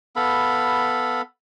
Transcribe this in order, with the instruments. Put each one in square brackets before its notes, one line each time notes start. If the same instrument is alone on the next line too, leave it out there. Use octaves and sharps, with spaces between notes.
[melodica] B3 A4 F5 B5